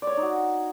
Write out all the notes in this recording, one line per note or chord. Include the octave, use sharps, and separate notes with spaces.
D5
C#5
D5
D#4
F#4